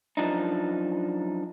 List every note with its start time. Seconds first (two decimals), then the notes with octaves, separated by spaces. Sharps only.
0.17 F#2 F3 D4 D#4